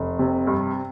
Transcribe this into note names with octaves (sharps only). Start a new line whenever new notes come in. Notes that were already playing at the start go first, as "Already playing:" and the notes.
Already playing: F1
C3
G2